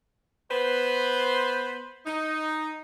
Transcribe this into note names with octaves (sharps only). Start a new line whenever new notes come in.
B3 B4 C5
D#4